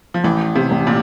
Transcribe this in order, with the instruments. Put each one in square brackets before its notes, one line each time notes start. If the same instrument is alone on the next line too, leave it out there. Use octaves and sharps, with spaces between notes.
[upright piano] F3
[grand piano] A1 [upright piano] E3
[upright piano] C3
[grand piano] A1
[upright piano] A#2